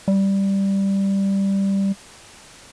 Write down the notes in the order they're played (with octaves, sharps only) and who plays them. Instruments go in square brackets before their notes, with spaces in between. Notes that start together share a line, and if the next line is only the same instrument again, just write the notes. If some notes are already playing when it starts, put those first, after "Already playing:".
[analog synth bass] G3